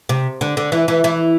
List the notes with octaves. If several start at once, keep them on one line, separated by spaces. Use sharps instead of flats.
C3
D3
D3
E3
E3
E3